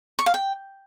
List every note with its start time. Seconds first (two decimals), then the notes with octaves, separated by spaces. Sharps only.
0.19 C#6
0.26 F5
0.34 G5